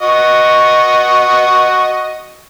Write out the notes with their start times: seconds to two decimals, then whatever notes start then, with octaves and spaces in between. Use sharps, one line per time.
0.02 F#4 D#5 C#6